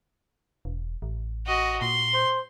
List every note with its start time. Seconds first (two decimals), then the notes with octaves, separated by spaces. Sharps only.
0.65 E1
1.02 A1
1.46 F#4 D#5
1.82 A#2 C6
2.13 C5